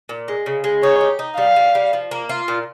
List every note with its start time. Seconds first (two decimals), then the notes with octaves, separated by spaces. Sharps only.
0.09 A#2
0.28 G#3
0.46 C#3
0.64 G#3
0.83 D#4 C#5
1.01 G4
1.19 D#4
1.37 G3 F5
1.56 G3
1.75 G3
1.93 F3
2.11 A#3
2.29 F4
2.48 A#2